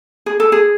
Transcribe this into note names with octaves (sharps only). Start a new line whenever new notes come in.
G#4
A4
G#4